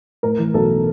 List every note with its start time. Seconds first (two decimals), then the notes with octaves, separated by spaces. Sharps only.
0.23 A2 A#4
0.39 E3
0.54 B1 A4